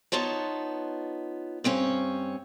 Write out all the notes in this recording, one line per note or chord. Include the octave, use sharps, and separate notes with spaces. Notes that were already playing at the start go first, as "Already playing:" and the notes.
B3 D#4 F4 C#5 A5
G2 C4 C#4 C#5